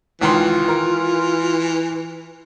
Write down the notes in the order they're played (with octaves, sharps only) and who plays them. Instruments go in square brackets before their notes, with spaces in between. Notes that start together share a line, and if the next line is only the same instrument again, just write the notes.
[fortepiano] C#2 D#3 C6 [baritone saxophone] E3 [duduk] F4
[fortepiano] A#4